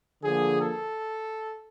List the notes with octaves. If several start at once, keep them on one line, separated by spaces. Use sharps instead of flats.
D3 F3 A#3 G#4
A4